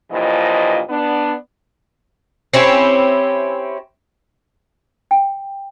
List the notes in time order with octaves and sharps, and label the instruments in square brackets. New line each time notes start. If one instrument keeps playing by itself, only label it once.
[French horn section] G2 A#2 E3 F3 D#5
B3 D4
[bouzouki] C4 C#4 E4 G4
[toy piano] G5